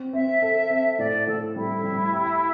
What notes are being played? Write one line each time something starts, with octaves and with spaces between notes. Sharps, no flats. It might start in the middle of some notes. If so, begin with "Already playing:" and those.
Already playing: C4
C4 E5
A4
C4
A2 D5
A2 A4
G3 E4
G3
G4